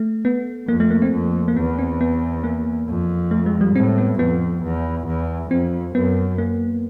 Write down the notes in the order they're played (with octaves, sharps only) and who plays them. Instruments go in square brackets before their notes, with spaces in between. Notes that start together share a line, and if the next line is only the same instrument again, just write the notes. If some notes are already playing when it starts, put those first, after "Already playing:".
Already playing: [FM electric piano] A3
B3
[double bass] F2 [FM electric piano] A#3
[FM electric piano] A3
A#3
C4
[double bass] F2
[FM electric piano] A#3
[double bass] E2 [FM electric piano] B3
[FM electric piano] C4
B3
A#3
[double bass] F2
[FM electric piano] A3
G#3
G3
[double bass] A2 [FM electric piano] C4
[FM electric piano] B3
[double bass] F2 [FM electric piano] B3
[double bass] E2
E2
[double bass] F2 [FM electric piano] C4
[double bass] F#2 [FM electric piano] B3
[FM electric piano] A#3